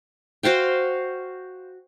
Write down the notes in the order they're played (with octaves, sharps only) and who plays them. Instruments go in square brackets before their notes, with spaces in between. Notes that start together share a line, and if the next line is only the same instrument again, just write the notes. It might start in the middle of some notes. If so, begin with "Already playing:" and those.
[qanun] F#4 C5 F5 G5